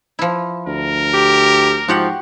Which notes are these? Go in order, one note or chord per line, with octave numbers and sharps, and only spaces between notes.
F3 E4
D2 A#4
G4
G#2 F3 F#4 G4 F#5